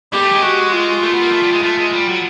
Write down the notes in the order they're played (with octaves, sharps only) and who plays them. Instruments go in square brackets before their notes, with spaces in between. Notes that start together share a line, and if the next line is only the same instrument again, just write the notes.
[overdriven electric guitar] G3 [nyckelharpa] G4
[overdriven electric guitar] A3
G#3
[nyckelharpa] F#4
F4
[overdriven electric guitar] A3
B3
A#3
A3
G3
G#3
[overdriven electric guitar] A3 [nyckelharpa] F4
[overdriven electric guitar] G#3
G3
F#3